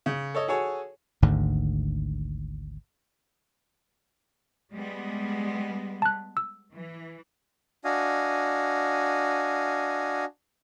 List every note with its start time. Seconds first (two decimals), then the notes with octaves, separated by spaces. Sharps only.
0.06 C#3
0.35 A4 C#5 D#5
0.48 F#4 G#4 A4 C#5 G#5
1.22 G#1 D2 G#2 D3
4.73 G3 G#3 B3
6.02 A5 F#6
6.37 E6
6.74 E3
7.85 D4 F#4 D#5 F5 G#5